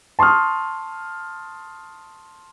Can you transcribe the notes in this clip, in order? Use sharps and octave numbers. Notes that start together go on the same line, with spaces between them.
A5 C6 C#6 D#6 F6